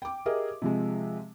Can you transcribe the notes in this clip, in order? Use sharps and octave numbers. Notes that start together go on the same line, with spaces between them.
G5 D6
G4 G#4 A#4 D#5 E5
C3 F3 G#3